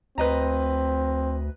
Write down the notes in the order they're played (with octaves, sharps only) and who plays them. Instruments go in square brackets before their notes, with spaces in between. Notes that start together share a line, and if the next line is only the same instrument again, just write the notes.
[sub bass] D2 [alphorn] C4 [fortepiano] B4 D#5 A#5